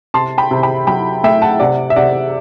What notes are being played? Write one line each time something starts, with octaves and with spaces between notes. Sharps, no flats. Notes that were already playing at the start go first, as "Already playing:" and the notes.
C3 A5 C6
G5 B5
C3
G5 B5
F#3 G5 B5
A3 E5 G5
F#5 A5
C3 D5 F#5
E5
C3 D5 F#5